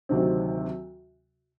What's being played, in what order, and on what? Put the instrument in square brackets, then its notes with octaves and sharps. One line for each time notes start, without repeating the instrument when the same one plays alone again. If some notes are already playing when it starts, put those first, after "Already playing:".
[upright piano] D2 C3 D#3 F#3 C4